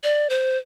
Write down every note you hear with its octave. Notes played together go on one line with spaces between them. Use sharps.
D5
C5